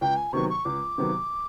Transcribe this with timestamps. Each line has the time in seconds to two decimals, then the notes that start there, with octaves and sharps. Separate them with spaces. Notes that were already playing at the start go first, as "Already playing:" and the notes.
0.01 C#2 G5
0.17 G#5
0.33 C3 D#3 F#3 B3 C#6
0.50 C#6
0.65 C#2 D6
0.98 C3 D#3 F#3 B3